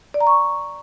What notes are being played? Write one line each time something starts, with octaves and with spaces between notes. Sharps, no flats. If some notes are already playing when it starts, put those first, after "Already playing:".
D5
A#5
C#6